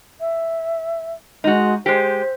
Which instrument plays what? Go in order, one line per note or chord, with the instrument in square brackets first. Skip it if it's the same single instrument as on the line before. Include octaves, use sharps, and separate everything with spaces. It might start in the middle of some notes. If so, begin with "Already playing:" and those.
[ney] E5
[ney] G#3 [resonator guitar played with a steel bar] D#4 F#4
[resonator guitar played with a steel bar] G#3 G4 [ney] C5